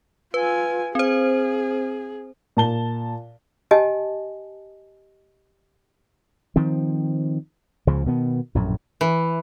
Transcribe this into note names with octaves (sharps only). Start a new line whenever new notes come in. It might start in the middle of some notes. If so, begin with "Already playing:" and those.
F4 B4 G#5
C4 G#4 C5
A#2 A5 G7
G4 D#5 G#5 A5
D#3 F3 C4
C#2 C#3 F3
B2 D#3 B3
A#1 F#2 A2
E3